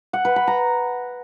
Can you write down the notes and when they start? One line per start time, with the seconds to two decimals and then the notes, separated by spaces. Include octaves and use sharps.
0.13 F#5
0.25 B4
0.36 B5
0.47 A#5